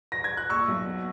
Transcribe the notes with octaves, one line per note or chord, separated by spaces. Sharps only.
A#6
G#6
F#6
A#2 C#6 E6
B1
B2